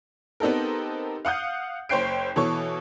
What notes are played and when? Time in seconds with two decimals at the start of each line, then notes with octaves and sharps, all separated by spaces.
0.40 B3 C4 D#4 G4 A4 A#4
1.25 F5 F#5 D#6 G6
1.89 F#1 C5 C#5 G5 C7 D7
2.36 B2 E3 A4 C#5 C#6